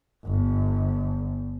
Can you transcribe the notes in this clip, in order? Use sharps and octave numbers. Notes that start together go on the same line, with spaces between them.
G1